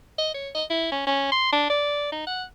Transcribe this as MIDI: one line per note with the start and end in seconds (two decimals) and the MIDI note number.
0.18 0.31 75
0.34 0.49 73
0.55 0.64 75
0.70 0.91 64
0.92 1.03 61
1.07 1.28 61
1.32 1.49 84
1.53 1.65 62
1.70 2.10 74
2.12 2.24 63
2.27 2.44 78